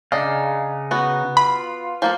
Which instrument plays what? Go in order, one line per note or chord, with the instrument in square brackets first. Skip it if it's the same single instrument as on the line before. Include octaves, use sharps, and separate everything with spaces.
[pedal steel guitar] C#3 D#4 F5 [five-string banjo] D4 D#5
[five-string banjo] B3 F#4
[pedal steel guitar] F4 [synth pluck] B5
[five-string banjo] F3 A#3 A4